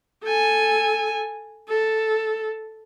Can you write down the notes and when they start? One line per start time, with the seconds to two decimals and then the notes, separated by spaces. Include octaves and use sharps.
0.24 A4 G#5
1.69 A4